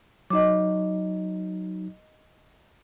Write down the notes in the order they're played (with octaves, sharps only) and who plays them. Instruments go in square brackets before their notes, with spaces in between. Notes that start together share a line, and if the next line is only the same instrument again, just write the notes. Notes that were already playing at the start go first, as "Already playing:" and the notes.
[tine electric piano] F#3 D#4 [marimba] D#5 D6